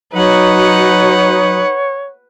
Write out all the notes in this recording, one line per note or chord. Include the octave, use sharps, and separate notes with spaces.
F#3 D#4 B4 C#5 F#5